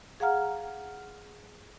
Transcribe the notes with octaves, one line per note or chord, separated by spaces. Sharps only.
G#4 F5 F#5 A#5 F6